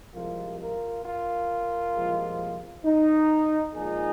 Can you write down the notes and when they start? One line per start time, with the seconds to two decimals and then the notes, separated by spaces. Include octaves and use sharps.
0.14 C2 C3 F3 G#3 F4 A#4
0.59 F4 A#4
1.04 F4 A#4
1.94 C2 A#2 F3 G#3
2.85 D#4
3.74 A#2 F3 G#3 D#4 G#4